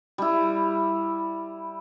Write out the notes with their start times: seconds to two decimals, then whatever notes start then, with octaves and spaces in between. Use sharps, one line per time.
0.18 G3 E4